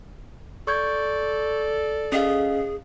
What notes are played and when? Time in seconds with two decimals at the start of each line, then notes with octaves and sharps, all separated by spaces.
0.67 A4 D5 C#6 G6 G#6
2.12 C#4 G#4 D#5 F5